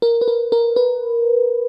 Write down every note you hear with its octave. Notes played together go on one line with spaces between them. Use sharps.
A#4
B4
A#4
A#4
B4